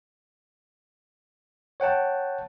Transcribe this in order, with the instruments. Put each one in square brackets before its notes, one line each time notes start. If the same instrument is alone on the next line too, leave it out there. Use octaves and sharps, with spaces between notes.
[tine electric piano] C#5 F#5 G5 A5